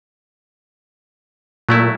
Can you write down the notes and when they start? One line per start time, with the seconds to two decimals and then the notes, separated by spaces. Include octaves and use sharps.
1.69 A#2 F#3 A3 E4